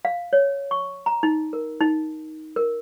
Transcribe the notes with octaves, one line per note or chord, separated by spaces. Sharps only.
F5
C#5
C#6
A#5
D#4
A#4
D#4
A#4